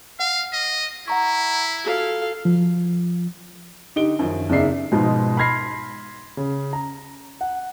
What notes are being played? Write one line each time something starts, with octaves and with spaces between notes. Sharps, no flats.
F5 F#5
D#5
E4 F#5 A#5 C#6
F4 F#4 A4 F5
F3
D3 D#4 G4 D7 G7
F#2 D#3 F3
E2 C#3 D#4 D5 E5 C7
G#2 B2 F3 D#4 F4
B5 C6 F6 G#6 A#6 C7
C#3
A#5
F#5